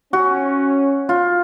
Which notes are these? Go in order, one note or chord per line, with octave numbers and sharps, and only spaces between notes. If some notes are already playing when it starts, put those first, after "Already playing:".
C#4 F#4
F4